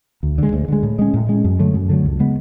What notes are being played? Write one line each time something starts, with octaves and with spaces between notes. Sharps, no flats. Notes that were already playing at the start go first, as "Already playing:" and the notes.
D2
D3 G#3
D2
D3 G#3
A2
G#3 C#4
A2
G#3 C#4
F#2
D3 F#3 A3
F#2
D3 F#3 A3
C#2
C#3 G#3 B3